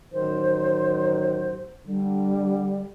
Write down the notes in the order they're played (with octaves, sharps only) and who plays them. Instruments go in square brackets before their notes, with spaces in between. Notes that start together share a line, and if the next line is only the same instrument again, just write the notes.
[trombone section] A1 D#3 F#3 [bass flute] C5
[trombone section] D3 [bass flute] G3